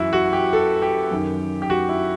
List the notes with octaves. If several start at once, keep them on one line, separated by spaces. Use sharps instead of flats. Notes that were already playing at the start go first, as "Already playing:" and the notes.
Already playing: F#2 E3 E4 F#4
F#4
G4
A4
G4
F#2 D#3
G4
F#4
E4